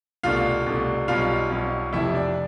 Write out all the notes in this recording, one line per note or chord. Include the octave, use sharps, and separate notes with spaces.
C2 B2 A3 D4 F4 F5
C2 B2 A3 D4
B1 B2 G3 F4 F5
B1 B2 G3
F1 F2 C3 F3 E4 E5
D4 D5